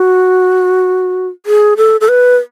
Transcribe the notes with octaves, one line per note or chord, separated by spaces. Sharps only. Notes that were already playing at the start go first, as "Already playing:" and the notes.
Already playing: F#4
G#4
A4
A4
B4